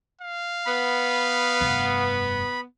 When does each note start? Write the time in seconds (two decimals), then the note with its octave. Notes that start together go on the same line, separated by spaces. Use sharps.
0.22 F5
0.66 B3 B5
1.61 F1 G2